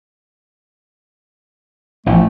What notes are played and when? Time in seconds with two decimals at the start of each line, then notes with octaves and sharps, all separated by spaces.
2.06 A1 F3 A3